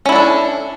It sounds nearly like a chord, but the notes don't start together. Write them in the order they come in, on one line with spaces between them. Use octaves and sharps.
C#4 E4 D4 A4